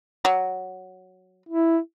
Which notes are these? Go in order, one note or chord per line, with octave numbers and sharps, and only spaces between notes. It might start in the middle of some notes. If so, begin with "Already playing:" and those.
F#3
E4